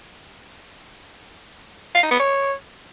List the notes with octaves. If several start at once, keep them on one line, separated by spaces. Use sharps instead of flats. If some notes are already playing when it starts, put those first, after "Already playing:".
F5
D#4
B3
C#5